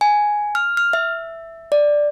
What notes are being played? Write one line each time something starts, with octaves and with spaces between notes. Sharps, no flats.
G#5
F6
F6
E5
D5